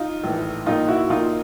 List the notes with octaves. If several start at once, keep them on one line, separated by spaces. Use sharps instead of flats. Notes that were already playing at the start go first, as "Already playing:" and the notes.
Already playing: D#4 F4
A#1 A2 E3
A#1 A#2 D#4 F4
E4 F#4
A#1 A#2 D#4 F4